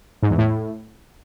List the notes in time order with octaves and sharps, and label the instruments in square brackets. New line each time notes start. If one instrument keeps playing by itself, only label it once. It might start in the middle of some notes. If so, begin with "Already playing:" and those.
[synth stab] G#2
E2
A2